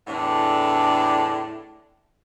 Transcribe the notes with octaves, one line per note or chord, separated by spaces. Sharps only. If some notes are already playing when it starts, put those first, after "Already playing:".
E2 A2 D3 D4